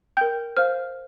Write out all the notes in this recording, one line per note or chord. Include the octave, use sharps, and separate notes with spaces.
A#4 G5 G6
C5 F5 F6